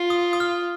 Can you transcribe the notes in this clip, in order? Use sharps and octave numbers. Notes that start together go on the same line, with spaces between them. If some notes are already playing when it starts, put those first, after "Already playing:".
Already playing: F4
D#6
D#6
F6